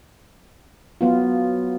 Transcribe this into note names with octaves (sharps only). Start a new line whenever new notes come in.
F#3 B3 F4